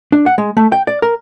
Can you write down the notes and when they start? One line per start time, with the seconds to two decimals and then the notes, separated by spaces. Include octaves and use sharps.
0.12 D4
0.26 F#5
0.38 G#3
0.57 A3
0.72 G5
0.87 D5
1.02 A#4